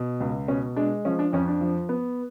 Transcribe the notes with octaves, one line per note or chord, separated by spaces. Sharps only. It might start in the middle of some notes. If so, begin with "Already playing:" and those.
Already playing: B2
C#2
B2 C#4
G#3 D4
F3 C#4
D4
F2 C#4
D4
F3
B3